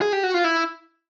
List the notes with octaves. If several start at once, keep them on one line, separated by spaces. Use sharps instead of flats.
G#4
G4
F#4
F4
E4